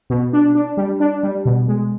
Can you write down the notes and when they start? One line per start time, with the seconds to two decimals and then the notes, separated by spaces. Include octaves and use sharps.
0.10 B2
0.33 D4
0.55 D4
0.77 G3
1.00 D4
1.23 G3
1.45 B2
1.68 G#3